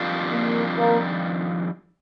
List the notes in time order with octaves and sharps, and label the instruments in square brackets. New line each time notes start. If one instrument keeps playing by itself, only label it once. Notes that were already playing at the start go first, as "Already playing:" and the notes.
Already playing: [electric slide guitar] F2 D#3 G3 D4 F4
[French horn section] A#3
A#3